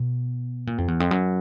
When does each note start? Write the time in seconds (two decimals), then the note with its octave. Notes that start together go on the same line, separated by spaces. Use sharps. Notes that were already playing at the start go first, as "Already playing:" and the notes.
Already playing: B2
0.67 A#2
0.78 F2
0.88 E2
1.00 F2
1.11 F#2